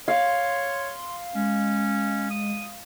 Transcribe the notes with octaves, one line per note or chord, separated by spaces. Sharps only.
C#5 F5 C6
G#3 C#4
D#6